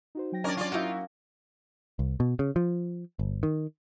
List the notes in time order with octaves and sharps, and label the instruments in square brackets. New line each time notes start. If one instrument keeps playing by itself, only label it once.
[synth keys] D#4 F#4 C5
F#3 G5 A#6
[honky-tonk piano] C#4 D4 [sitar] A#4 D5
[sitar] F4 D5
[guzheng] A#3 C#4 D#4 [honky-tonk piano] E4 F#4
[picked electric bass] C2
B2
C#3
F3
G1
D#3